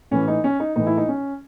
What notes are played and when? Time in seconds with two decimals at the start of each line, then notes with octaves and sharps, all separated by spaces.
0.11 A2 E3 C#4
0.28 D#4
0.44 C#4
0.60 D#4
0.76 A2 E3 D#4
0.86 E4
0.97 D#4
1.08 C#4